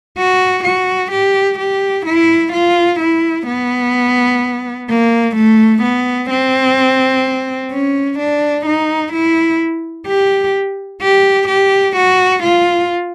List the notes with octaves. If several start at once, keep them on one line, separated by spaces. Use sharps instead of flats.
F#4
F#4
G4
G4
E4
F4
E4
B3
A#3
A3
B3
C4
C#4
D4
D#4
E4
G4
G4
G4
F#4
F4